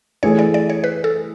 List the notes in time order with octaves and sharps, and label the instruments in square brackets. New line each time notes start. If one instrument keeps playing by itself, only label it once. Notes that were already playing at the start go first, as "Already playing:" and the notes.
[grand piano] E3 A3 E4 G#4 [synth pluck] C#5
[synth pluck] D5
D5
C#5
B4
A4